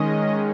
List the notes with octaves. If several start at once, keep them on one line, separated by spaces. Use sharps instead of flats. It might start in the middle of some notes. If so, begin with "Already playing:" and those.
Already playing: D#3 G#3 C#4 D#5